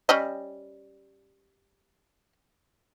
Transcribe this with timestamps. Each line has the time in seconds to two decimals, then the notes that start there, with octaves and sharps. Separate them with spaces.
0.09 G3 C#4 D#5